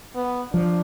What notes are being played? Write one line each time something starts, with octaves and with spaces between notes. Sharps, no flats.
B3
F3 D4